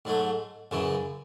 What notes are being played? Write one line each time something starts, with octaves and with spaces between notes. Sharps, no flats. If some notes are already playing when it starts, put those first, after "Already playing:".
G#2 F#3 A3
F#2 C#3 E3